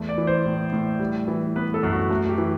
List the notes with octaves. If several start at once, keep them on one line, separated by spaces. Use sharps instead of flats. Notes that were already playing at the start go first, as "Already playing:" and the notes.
Already playing: E2 A3
D5
E3
C5
A2
A2
G3
E3
B3 B4
A4
F#2
F#4
A3 F#4
G4
E3